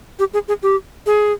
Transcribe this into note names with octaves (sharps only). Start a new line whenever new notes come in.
G4
G#4
G#4
G4
G#4